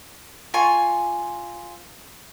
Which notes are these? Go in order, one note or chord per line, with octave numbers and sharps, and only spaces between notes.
F4 G#5 C#6